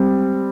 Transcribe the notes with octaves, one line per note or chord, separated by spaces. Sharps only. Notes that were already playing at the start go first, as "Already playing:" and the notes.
Already playing: G3 C4